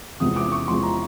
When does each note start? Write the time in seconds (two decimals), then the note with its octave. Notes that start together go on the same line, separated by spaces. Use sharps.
0.20 E2 C3 F3 G#3 D#6
0.36 D6
0.52 C#6
0.68 E2 C3 F3 G#3 C6
0.83 A#5